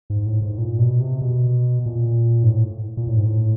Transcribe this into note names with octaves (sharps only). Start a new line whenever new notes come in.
G#2
A2
G#2
A#2
B2
C3
B2
A#2
G#2
A2
A#2
A2
G#2
A2